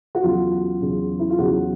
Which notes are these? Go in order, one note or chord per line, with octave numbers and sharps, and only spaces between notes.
F#4
E2 C#3 F#3 F4
E2 C#3 F#3
E4
F4
E2 C#3 F#3 F#4